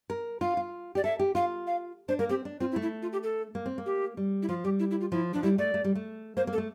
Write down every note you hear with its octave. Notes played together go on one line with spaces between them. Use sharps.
A#4
F4 F5
F4
G4 D5
A4 E5
G4
F4 F5
F5
D4 C5
A#3 A#4
C4 G4
D4
C4 F4
E4
A3
E4
F4
G4
A4
A#3
C4
A#3
G4
G3
E4
F3 F4
G3 G4
E4
E4
F4
F3 E4
F3 D4
G3 E4
A3 D5
A3
G3
A3
A#3 C5
A#3
A4
A3